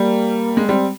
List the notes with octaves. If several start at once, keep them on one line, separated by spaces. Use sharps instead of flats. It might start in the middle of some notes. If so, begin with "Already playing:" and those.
Already playing: G3 A#3
G#3
G3 C4